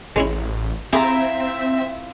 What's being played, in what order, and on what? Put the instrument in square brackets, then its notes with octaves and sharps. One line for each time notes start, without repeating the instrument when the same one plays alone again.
[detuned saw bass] A1 [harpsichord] G#3 C#4 E4
[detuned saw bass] C4 [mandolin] E4 F4 A#5 [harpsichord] G4 G#4 [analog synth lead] E5